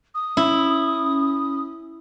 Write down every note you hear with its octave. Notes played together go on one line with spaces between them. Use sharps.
D#6
C#4 E4